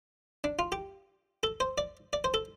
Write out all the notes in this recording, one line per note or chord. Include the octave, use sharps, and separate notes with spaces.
D4
F4
G4
A4
C5
D5
D5
C5
A4